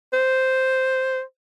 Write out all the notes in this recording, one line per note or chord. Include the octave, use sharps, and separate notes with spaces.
C5